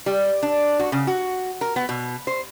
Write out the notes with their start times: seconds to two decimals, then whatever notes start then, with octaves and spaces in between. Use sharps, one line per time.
0.06 G3
0.43 D4
0.79 F#4
0.92 C#3
1.07 F#4
1.61 A#4
1.76 B3
1.89 B2
2.27 C5